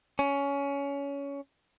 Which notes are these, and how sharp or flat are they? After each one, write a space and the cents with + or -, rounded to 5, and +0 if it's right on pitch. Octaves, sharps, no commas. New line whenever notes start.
C#4 +20